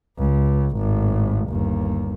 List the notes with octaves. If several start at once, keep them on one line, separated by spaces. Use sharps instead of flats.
C#2
G#1 A2
G1 D#2